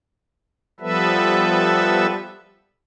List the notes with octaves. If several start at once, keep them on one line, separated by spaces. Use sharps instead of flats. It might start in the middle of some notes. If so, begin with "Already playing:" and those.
F3 G3 B3 A4 B4 E5